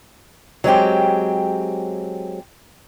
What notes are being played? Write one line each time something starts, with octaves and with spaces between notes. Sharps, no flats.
F#3 G#3 C4 G4